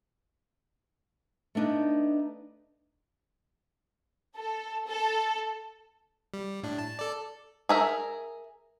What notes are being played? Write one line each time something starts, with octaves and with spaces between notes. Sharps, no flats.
A3 B3 D4 D#4
A4
A4
G3
A2 D4
A5
A4 D5
G#4 A#4 E5